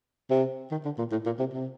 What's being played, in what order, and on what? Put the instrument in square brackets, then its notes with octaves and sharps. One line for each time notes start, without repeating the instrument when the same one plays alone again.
[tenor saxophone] C3
D#3
D3
A#2
A2
A#2
C3
C3